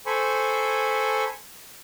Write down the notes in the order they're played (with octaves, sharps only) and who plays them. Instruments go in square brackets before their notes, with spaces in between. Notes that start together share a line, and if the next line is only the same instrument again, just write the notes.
[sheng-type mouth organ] A4 C5 G#5 B5 C#6